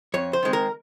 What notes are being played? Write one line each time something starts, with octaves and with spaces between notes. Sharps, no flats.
F2 C#5
C5
D#3 G#3 C4
A#4